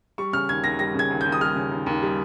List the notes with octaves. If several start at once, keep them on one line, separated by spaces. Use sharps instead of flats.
G3 C#6
C#3 F6
D#2 G#6
D#2 A#6
G3 A#6
C#3
G#6
D#2
D#2 G6
D#6
G3 F6
C#3
D#2
D#2
G3